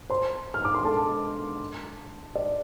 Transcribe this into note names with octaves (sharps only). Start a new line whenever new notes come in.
C5 C6
F6
D6
C6
A4 A5
D5